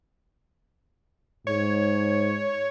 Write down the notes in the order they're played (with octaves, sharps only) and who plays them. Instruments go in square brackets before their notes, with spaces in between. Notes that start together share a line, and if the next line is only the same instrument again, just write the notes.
[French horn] G#2 [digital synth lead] C#5